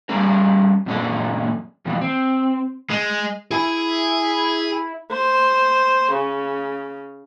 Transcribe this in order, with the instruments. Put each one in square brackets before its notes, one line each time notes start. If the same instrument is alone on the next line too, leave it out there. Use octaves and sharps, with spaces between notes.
[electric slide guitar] G3 C#4 G#4 A#4
F#2 A#2 C#4 D4 G#4 A4
F2 B2 E3
C4
[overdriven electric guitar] G#3
[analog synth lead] E4 [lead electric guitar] G#4 G#5
[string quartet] C5
C#3